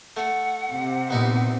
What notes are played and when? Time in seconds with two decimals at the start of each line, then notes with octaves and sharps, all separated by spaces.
0.17 A3 F#5
0.72 C3
1.10 A#2 B3 D#4 E4